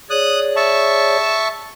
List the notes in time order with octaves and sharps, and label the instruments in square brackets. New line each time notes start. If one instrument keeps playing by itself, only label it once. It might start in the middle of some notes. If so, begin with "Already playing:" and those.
[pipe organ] G#4 C#5 D5 [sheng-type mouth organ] D#6 F#6
[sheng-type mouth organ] E5 A5 C#6